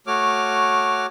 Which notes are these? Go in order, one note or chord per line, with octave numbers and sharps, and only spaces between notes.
A3 F#4 C#5 D6 F6